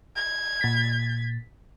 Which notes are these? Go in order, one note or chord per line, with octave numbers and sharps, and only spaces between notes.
G#6
A#2 A6 B6